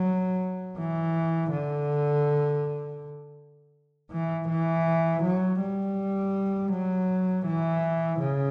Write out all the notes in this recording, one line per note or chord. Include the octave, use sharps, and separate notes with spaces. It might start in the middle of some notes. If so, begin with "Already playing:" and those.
Already playing: F#3
E3
D3
E3
E3
F#3
G3
F#3
E3
C#3